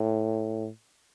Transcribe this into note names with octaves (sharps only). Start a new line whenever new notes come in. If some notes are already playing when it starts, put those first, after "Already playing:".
Already playing: A2